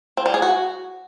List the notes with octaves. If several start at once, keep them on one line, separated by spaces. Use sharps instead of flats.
C4
G3
G#4
F#4